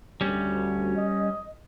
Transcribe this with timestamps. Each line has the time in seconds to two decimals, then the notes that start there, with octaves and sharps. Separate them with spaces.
0.21 D2 G3 C#4
0.96 D#5